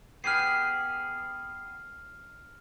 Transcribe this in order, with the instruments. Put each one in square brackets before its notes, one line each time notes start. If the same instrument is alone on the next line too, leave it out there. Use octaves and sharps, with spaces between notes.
[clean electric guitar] B3 G4 G#4 [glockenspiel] F6 C7